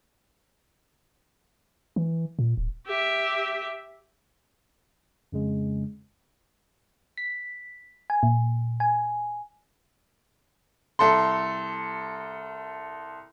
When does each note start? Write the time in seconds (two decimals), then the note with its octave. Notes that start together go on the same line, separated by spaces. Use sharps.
1.96 E3
2.39 A#2
2.57 D1
2.87 G4 E5
5.32 F2 C#3 G#3
7.17 B6
8.10 G#5
8.23 A#2
8.80 G#5
10.99 C2 A4 C6